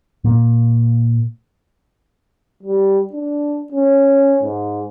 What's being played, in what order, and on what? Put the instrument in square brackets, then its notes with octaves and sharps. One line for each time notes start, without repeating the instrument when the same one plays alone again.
[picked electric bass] A#2 A#3
[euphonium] G3
D4
C#4
G#2